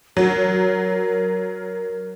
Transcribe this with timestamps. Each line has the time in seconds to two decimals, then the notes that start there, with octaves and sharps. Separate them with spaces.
0.17 F#3 A#4